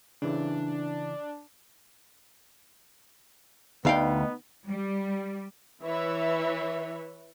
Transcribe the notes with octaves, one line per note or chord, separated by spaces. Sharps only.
C#3 E3 D4
D2 B3 D#4 F5 G5
G3
E3 E4 B4 C#5 E5